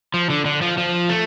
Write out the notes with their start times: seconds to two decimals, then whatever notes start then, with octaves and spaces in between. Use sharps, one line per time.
0.14 F3
0.30 D3
0.45 D3
0.61 F3
0.78 F3
1.10 A3